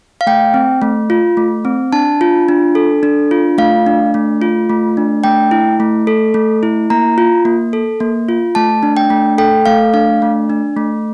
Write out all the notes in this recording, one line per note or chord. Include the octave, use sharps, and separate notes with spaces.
F5
A3 G5
C4
A3
F4
A3
C4
D4 A5
F4
D4
A4
D4
F4
A3 F5
D4
A3
F4
A3
D4
A3 G5
E4
A3
A4
A3
E4
A#3 A#5
F4
A#3
A4
A#3
F4
A3 A5
D4
G5
A3
A4 G5
A3 F5
D4 F5
A3
D4
A3